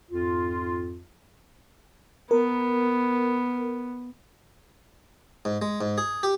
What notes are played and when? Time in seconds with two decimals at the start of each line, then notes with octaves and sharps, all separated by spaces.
0.11 F2 G#2 F4
2.31 B3 A#4
5.45 G#2
5.62 G#3
5.81 G#2
5.98 G#4
6.23 G4